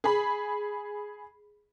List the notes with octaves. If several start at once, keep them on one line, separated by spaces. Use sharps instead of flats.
G#4 B5